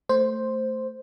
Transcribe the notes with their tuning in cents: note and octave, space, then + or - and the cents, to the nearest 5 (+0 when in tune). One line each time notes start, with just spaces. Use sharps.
A3 +10 C5 +0